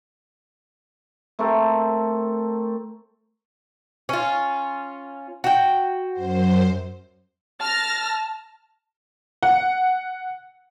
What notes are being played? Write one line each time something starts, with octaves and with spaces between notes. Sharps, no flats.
A3 C4 A4 A#4
C#4 F4
F#4 G5
F#2 C5
A5 F6 A6 A#6
F#5